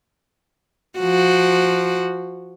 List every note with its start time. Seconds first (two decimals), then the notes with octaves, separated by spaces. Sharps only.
0.99 F3 F#4